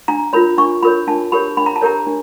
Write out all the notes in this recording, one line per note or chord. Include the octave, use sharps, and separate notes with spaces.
D4 A#5
F4 A#4 C#5 B5
D4 C#6
F4 A#4 C#5 B5
D4 A5
G4 A#4 C#5 B5
D4 B5
A#5
A5
G4 A#4 C#5 A#5
D4